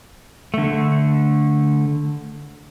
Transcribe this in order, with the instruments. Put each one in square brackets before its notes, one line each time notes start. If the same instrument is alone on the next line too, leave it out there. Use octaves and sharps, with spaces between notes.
[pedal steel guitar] D3 A3